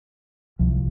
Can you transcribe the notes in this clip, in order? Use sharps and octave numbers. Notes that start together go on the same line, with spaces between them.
C2 C3 F3